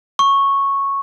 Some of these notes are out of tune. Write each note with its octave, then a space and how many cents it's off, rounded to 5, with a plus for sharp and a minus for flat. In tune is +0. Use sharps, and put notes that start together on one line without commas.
C#6 -5